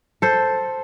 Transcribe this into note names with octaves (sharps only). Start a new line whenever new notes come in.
A4 C5